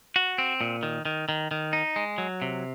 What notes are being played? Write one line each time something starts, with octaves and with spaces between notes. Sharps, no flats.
F#4
C4
A#2
D#3
D#3
D#3
D#3
D#4
G#3
F#3
C3